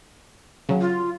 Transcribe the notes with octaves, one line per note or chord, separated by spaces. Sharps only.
C#3 F#3
F4